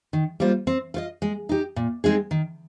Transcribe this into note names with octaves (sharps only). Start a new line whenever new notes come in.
D#3
G3 A#3 F4 C5
C4
F4 C5 D#5
G#3
D#4 G4
A#2
G#3 C4 D#4 G#4
D#3